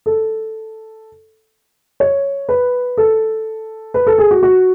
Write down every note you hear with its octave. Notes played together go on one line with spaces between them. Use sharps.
A4
C#5
B4
A4
B4
A4
G#4
F#4
F#4